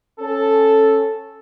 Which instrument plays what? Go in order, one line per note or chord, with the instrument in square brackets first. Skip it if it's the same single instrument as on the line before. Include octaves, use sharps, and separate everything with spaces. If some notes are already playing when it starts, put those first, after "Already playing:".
[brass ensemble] C#4 A4